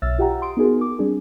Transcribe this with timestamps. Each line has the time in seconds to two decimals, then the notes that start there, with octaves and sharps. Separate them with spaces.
0.02 B1 C#5 E5 E6 F6 A6
0.18 F4 G4 E5 F#5 G5 A#5
0.42 C6 D#6 D7
0.57 B3 D#4 F#4 G#4 A#4
0.81 D6
0.99 G3 C4 D4 G#4